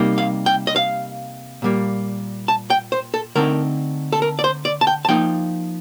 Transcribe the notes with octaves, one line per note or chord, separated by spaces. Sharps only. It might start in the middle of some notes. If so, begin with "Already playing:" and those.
Already playing: C3 G3 A#3 D#4
F5
G5
D#5
F5
A#2 G3 A#3
A5
G5
C5
A4
D3 A3 C4 D#4 A#4
A4
A#4
D5
C5
D5
A5
G5
A5
F3 A#3 D#4 G5